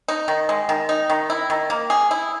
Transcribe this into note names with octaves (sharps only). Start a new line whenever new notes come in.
D#4
D#3
G#3
D#3
D#4
D#3
E4
D#3
A#3
G#4
E4